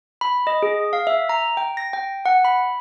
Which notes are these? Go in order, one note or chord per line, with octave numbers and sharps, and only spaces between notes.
B5
D#5
G#4
F5
E5
A#5
G5
A#6
G5
F#5
B5